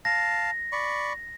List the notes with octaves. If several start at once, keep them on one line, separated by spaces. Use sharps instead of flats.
F5 A5 A#6
D5 B5 C#6